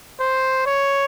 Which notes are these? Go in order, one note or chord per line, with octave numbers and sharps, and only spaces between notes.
C5
C#5